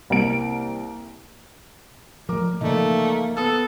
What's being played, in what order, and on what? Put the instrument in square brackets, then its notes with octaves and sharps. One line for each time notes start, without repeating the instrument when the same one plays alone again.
[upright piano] C2 A#3 D7
[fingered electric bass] F3 A3 [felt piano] A#4 D6
[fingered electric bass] C#3 E3 F3 [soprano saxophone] A3 [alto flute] A#3 [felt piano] D#4 D5
[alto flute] B3 [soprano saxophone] A4 [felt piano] D#6 E6